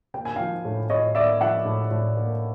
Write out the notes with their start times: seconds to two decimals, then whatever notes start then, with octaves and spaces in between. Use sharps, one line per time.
0.14 A#3 G5
0.25 G#5
0.36 F3 F5 G5
0.65 A2
0.90 A2 C#5 D#5
1.15 A#3 D5 E5
1.41 F3 E5 F#5
1.65 A2
1.91 A2
2.16 A#3